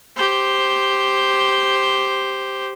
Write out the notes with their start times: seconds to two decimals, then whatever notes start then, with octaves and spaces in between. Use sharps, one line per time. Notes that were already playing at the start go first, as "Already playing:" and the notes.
0.16 G4 C5